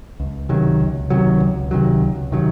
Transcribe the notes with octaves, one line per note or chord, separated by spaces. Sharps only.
C#2
C3 D#3 F#3
C#2
C3 D#3 F#3
C#2
C3 D#3 F#3
C#2
C3 D#3 F#3